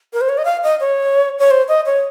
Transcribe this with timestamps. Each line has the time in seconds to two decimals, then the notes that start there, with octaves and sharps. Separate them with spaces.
0.13 A#4
0.21 C5
0.29 C#5
0.38 D#5
0.45 F5
0.63 D#5
0.80 C#5
1.39 C#5
1.51 C5
1.68 D#5
1.86 C#5